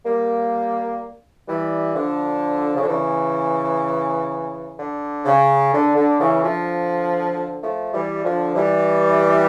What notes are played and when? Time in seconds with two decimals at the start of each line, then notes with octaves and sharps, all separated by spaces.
0.04 G3 A#3
1.46 E3 G3
1.94 D3 F3
2.74 C#3
2.82 D3
2.88 C#3 E3
4.78 D3
5.24 C#3
5.72 D3
5.95 D3
6.19 C#3 E3
6.42 D3 F3
7.61 F3 A3
7.92 E3 G3
8.23 D3 F3
8.55 E3 G3